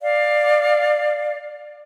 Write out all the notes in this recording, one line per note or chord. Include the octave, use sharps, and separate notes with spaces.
D5 F5